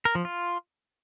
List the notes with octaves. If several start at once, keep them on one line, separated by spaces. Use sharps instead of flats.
A#4
F3
F4